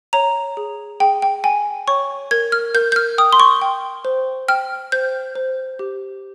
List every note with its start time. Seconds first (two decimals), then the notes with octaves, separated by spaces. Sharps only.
0.13 C#5 A#5
0.57 G#4
1.00 G#4 G5
1.22 G5
1.44 G5 G#5
1.88 C#5 C#6
2.31 A#4 G#6
2.52 F6
2.75 A#4 G6
2.92 G6
2.96 F6
3.18 G5 D#6
3.33 C6
3.40 C#6
3.62 G5
4.05 C5
4.48 G5 F6
4.92 C5 G6
5.36 C5
5.79 G4